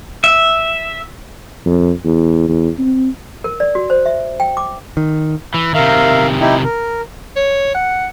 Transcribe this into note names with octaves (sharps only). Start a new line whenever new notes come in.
E5
F2
E2
E2
C4
A#4
D5
F#4
C5
E5
G5
D6
D#3
E3
C3 D#3 A#4 E5 F5
D#4 E4 G4
A#4
C#5
F#5